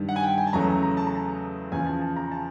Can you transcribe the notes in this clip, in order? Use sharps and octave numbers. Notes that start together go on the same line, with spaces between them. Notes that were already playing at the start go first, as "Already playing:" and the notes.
Already playing: G2 D#3 G3
F#5
G#5
G5
G#5
A5
E2 C#3 F#3 A3 A#5
A#5
A5
A#5
A5
E2 C#3 F3 G#5
A5
A5
A#5
A5